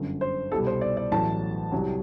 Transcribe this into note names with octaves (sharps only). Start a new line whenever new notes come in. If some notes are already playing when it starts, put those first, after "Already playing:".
Already playing: G1 F#2 D3
C5
C2 B2 G3 B3 A4
C5
D5
D5
A1 A2 F#3 A5
C2 C3 F#3